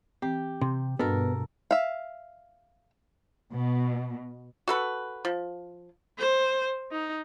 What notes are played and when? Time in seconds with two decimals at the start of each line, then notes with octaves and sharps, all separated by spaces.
0.22 E3 C4 G4
0.62 C3 C6
0.99 G2 B2 B3 D4 F#4 A4 A#4 D#5
1.71 E5 F5
3.54 B2
4.68 F#4 A4 B4
5.25 F3
6.19 C5
6.92 D#4